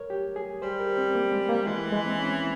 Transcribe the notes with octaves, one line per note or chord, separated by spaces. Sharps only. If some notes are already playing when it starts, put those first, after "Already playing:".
Already playing: A#4 C#5
G4
G#4
G3 C5
A#4
C4
A#3
G#3
A#3
E3 G#3
A#3
G#3
C4
C#4